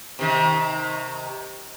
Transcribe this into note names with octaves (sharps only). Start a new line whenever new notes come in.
C3 D#3